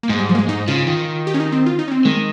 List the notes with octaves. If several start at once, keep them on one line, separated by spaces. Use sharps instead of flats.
A#3
G#2 G#3
G3
F3
A#3
G#3
G#2 D#4
C#3 F4
D#3
G4
C#4
D#4
C4
F4
D#4
C#4
C4
D#3 G#3